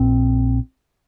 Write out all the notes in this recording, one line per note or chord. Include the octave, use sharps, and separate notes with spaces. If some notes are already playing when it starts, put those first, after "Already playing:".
Already playing: A#1 A#2 C4